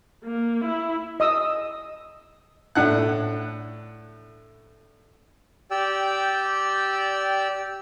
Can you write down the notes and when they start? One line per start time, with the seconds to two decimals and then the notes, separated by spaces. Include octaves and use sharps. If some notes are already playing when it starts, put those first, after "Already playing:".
0.24 A#3
0.65 E4
1.20 D#5 D#6 E6
2.75 A2 D4 F#5 F#6
5.71 G4 D5 G5 E6